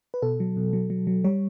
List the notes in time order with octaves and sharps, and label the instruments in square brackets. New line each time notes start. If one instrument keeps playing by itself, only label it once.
[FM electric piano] B4
B2 A4
F#3
B2
F#3
F#3
F#3
G3 C#5